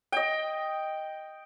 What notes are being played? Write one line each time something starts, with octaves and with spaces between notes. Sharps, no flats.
D#5 G5